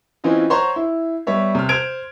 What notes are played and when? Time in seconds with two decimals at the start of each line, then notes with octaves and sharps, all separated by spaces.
0.24 E3 C4 C#4 F4 D#5
0.50 C5 C#5 F#5 A#5 C6 C#6
0.76 E4
1.27 G3 B3 C#5 E5
1.55 C3 F6
1.69 C5 G#6 D7 F7